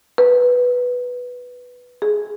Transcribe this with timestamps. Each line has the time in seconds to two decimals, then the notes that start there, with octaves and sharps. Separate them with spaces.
0.18 B4
2.02 G#4